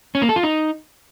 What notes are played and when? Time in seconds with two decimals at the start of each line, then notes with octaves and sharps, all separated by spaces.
0.15 C#4
0.22 A#3
0.29 A4
0.36 F4
0.43 D#4